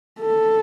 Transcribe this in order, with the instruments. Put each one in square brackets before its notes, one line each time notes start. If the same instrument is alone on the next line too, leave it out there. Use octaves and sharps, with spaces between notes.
[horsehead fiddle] A4